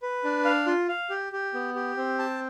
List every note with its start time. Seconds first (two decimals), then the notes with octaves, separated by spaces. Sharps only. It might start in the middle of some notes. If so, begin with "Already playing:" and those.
0.02 B4
0.24 D4
0.45 F5
0.66 F4
0.88 F5
1.10 G4
1.33 G4
1.54 B3
1.75 G4
1.97 C4
2.19 A5